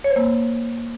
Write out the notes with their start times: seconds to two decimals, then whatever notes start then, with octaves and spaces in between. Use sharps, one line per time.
0.04 C#5
0.10 C5
0.16 A#3